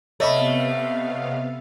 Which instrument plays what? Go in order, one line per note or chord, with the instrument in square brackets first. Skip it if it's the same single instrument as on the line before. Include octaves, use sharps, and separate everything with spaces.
[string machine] C3 B3 F5 [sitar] A3 [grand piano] C#5 D#5 B5